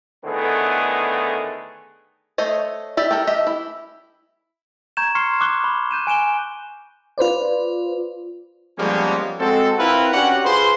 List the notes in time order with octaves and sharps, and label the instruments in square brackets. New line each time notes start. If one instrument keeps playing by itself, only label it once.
[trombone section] A2 D3 D#3 A3 B3 G#4
[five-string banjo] A3 C5 C#5 D#5
G4 D5 E5
A4 A#4 G5
G4 D#5 E5
E4
[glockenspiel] A#5 C#6 G6 G#6 E7
C6 C#6 F6 C7 C#7
C#6 D6 F#6 G7
B5
F#6 G6 D#7 E7
G#5 D7 E7 G7
[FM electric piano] F4 B4 C5 D5
[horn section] F3 G3 G#3 A#3 B3 C#4
G#3 C4 F#4 A4
C4 E4 F4 A#4 B4
C#4 D4 F#4 G4 F#5
F4 G#4 B4 C5 C6